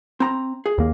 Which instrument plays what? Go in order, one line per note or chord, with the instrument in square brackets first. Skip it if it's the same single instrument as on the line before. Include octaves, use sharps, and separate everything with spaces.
[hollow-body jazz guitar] C4 A#5
G#4
[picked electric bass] D#2 A#3